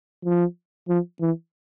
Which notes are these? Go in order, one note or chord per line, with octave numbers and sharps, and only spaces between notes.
F3
F3
E3